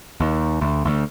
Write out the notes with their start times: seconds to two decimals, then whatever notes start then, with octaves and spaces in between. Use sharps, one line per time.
0.20 D#2
0.61 D2
0.85 D2